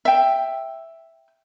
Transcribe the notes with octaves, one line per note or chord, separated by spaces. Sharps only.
E5 G5